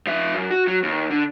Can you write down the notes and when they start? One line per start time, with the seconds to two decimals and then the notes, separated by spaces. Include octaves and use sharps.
0.07 F3 E5
0.34 F#2
0.51 F#4
0.67 F#3
0.83 D#2
1.11 D3